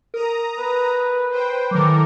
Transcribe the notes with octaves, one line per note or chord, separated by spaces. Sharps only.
A#4 A#5 D#6
B4
C5 G5
D#3 E3 F#3 A4 A#4 D6